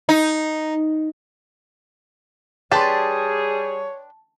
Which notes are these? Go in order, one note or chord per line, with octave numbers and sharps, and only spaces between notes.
D#4
G3 D4 G4 G#4 B4 C#5 A5 C6